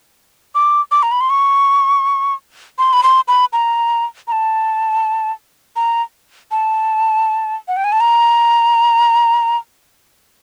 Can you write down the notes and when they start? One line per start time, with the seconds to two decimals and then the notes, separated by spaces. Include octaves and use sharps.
0.55 D6
0.91 D6
1.03 A#5
1.12 B5
1.21 C6
1.30 C#6
2.78 C6
2.93 B5
3.03 C6
3.28 B5
3.53 A#5
4.28 A#5
4.32 A5
5.76 A#5
6.51 A5
7.68 F#5
7.77 G5
7.84 G#5
7.92 A5
8.00 A#5